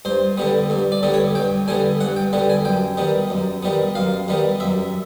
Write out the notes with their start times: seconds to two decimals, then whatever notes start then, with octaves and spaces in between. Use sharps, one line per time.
0.05 G2 C5
0.37 D3 G3 B3
0.70 G2
0.92 D5
1.03 D3 G3 B3
1.14 C#5
1.35 G2 G5
1.68 D3 G3 B3 G#5
2.00 G2 F#5
2.16 G5
2.33 D3 G3 B3
2.50 G#5
2.65 F#2 G5
2.97 D#3 G3 B3
3.30 F#2
3.63 D#3 G3 B3
3.95 F#2 F5
4.28 D#3 G3 B3
4.60 F#2 E5